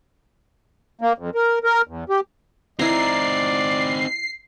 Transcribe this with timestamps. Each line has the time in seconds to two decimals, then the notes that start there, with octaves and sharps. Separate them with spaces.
1.01 A#3
1.18 F2
1.35 A#4
1.64 A#4
1.87 E2
2.09 G4
2.79 C4 D#4 E4 D5 A#5 C7